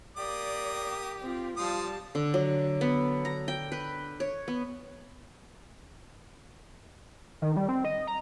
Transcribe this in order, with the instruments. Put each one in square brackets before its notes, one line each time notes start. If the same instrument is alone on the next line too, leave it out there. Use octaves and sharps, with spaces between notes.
[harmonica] A#3 D#6 [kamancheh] G4 [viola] D5
[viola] C4 F4
[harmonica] F3 D#6 [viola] G3 [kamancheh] F5 A5
[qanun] D3
F#3
B3
A#5
G5
B4
C#5
B3
[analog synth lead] D#3
G3
C4
D#5
A#5